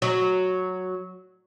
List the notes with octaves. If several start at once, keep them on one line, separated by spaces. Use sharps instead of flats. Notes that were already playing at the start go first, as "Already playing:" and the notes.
F#3